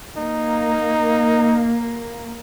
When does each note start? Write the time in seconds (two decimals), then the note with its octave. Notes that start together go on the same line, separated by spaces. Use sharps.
0.17 A#3 D#4